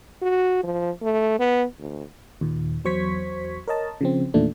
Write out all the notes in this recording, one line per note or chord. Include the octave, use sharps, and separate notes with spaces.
F#4
F3
A3
B3
D2
D#2 A#2
E2 F#3 C5 C#6 G#6 B6
A#4 C#5 D#5 A5
C#3 F3 C4
E2 A#2 D#3 A3 D4